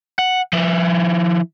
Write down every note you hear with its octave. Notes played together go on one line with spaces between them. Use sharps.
F#5
F3 E4